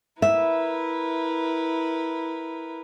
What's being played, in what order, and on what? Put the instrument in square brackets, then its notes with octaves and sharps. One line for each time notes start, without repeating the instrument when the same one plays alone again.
[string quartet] E4 A#4 B4 [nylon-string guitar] E5